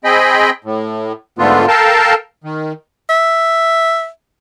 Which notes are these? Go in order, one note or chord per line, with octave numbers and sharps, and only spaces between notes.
C4 G#4 D#5 G5 B5
A2
G#2 D3 A3 B3 F4
A4 A#4 F5 G5 A5
D#3
E5